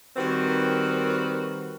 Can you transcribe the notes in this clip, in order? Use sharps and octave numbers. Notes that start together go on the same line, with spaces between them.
D#3 G3 C4 F#4 A#4 B4